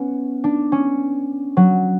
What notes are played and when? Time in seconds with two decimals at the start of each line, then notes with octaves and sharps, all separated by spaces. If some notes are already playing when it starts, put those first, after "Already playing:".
Already playing: B3 C#4
0.44 D4
0.72 C#4
1.57 F#3